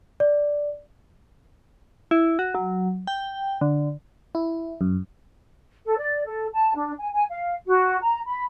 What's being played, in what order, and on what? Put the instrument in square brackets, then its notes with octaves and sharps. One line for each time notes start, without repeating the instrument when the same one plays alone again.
[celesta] D5
[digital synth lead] E4
F#4
F#3
G5
D3
[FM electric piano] E4
F#2
[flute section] A4
D5
A4
A5
D4
G#5
G#5
F5
F#4
A#5
B5